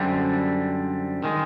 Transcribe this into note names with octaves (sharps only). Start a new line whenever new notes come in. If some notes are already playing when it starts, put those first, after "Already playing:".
Already playing: F#2 D3 G3 C4
D#3 G#3